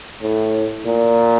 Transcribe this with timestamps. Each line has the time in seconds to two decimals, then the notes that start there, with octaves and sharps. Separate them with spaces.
0.22 A2
0.85 A#2